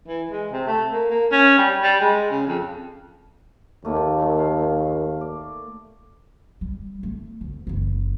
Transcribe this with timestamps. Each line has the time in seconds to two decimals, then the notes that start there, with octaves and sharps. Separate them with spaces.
0.08 E3
0.30 G#3
0.51 C3
0.67 A3
0.91 A#3
1.10 A#3
1.32 C#4
1.58 G3
1.83 G3
2.01 G#3
2.30 C#3
2.47 F2
3.85 D#2 A3 A#3
4.38 F5
5.21 D5
6.61 G3
7.03 A3
7.41 D2
7.67 F#1 E3